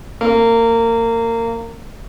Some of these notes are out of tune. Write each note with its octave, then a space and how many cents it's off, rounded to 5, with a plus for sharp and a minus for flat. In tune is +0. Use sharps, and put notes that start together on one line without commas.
A#3 -25